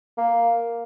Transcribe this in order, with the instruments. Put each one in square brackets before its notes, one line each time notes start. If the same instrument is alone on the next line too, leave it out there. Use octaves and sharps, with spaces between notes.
[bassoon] A#3